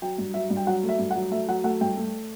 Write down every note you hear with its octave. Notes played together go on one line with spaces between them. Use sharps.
F#3 G5
G2
F#3 E5
G2
G5
F#3 F#5
A3
E5
G2
F#5
F#3
A3 E5
F#3 F#5
A3 F#5
G2 G5
A3